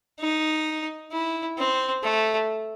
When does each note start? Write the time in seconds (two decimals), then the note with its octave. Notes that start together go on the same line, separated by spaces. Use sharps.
0.20 D#4
1.12 E4
1.58 C4
2.03 A3